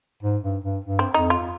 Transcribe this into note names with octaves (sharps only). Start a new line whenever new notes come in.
G#2
G2
G2
G2
C4
F2 D#4
F4